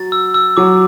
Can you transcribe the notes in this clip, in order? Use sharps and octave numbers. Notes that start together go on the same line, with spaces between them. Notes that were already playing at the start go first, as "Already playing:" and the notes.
Already playing: F#3 A6
E6
E6
F#3 D6